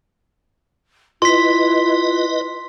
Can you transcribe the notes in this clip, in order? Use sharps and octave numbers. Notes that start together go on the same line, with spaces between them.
E4 F4 B4 D#5 C6 B6